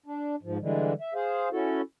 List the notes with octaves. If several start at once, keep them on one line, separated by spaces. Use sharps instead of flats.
D4
G#2 F3
D3 E3 G3 G#3
E5
G#4 C5 F5
C#4 E4 F#4 A4